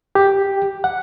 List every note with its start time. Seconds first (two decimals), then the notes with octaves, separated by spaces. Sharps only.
0.15 G4
0.84 F#5